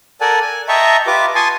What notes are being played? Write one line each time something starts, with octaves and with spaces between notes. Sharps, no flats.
A4 A#4 D5 F#5 G#5 A5
G#5
D#5 E5 G5 A5 A#5 C#6
F4 G4 B4 D6
G#5 A5 C6 C#6 D#6